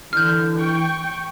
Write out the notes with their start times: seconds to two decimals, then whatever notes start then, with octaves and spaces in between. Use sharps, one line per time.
0.13 D3 E3 F6 G6
0.56 G5 C#6